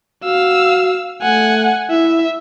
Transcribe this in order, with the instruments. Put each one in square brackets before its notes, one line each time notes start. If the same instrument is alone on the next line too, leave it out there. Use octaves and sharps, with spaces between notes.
[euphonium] F#4 [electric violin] F5 E6
[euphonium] A3 [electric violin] F#5 G#5
[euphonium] E4 [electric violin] E5